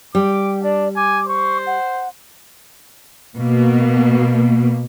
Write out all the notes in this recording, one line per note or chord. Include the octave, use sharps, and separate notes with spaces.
G3 G5 D6
D4 D5
G#5 D6
C5 C#6
F#5
B2 A#3